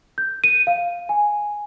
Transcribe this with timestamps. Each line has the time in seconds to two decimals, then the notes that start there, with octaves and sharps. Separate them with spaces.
0.18 G6
0.44 D#7
0.67 F5
1.09 G#5